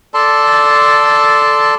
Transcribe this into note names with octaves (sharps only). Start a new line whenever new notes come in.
A4 D5 A5 C6